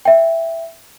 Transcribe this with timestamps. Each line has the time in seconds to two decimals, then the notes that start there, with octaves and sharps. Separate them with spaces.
0.05 E5 G5